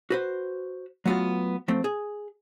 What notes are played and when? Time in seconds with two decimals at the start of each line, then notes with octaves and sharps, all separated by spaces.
0.10 F#4 B4 C5
1.06 F#3 A3 B3 F4 F#4
1.68 F3 A3 C4
1.84 G#4